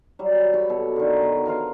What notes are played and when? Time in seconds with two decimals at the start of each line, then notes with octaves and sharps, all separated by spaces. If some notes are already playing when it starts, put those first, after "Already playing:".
0.19 F#3 G3
0.54 B4 C#5 B5
0.69 B2 A4
0.96 D3 D#3
1.22 F#4
1.46 F4 A#4 B4 F5